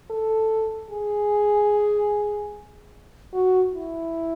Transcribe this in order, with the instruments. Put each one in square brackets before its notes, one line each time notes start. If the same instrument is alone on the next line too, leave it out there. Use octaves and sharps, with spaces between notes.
[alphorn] A4
G#4
F#4
E4